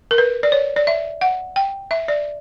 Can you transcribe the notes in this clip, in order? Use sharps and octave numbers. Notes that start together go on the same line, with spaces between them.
A#4
B4
D5
C#5
D5
E5
F#5
G5
E5
D5